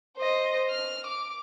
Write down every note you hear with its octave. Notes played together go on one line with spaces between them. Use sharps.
C5 D#5
F6
D6